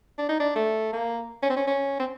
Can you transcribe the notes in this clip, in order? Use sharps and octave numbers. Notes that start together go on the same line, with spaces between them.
D4
D#4
D4
A3
A#3
C#4
C4
C#4
C#4
C4